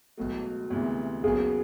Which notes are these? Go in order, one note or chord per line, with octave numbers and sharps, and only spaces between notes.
C#2 B2 F#3 A3
D2 C3 E3 G#3 B3
D#2 C#3 F#3 B3 G#4